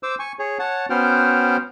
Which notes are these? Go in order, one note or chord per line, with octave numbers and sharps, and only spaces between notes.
C5 D6 E6
G#5 C#6
G#4 C#5
C#5 F#5 A5
B3 C#4 F#4 C5 G5 F6